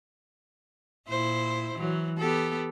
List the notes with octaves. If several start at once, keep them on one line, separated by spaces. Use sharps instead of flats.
A#2 E4 C5
E3 F#3
B3 G4 A4